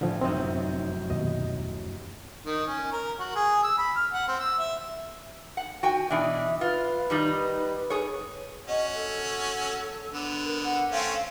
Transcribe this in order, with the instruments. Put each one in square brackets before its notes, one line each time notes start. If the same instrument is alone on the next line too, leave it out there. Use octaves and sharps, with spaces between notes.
[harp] A1 [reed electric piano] D3 F3
[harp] F1 F#2 D#5 [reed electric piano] C4 D#4
[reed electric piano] D#2 B2 [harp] D#5
[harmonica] D#3
C#4
A#4
F#4
G#4
E6
B5
F6
F#5
C4
E6
E5
[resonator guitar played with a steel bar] F#5
F#4 G5 G#5
[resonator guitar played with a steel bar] B2 E3 D4 [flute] E5
[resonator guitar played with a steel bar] F4 [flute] B4
[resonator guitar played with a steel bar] D#3 G3 D#4
G#4 C#5
[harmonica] C#4 F#4 [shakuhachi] D#5
[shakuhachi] A4
[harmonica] D3 B3
[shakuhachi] A#4
F#5
[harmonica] A3 C4 C#4 [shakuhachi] F5